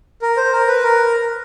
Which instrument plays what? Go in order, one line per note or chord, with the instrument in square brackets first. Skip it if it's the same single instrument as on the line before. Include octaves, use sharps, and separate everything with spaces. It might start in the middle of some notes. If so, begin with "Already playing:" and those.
[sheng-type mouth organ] A#4
C5
A#4
B4
A#4